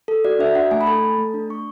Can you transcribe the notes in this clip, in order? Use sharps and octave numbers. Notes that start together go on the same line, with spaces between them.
A4
F#4 D5
D4 E5
D4 F#5
A3 G#5
B5
A4 A5
A4
A3
D4
D4 C#6